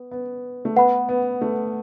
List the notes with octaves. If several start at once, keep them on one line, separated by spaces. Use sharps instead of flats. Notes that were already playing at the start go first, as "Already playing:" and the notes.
Already playing: B3
B3
A3
B3 B4 F#5 B5
B3
A3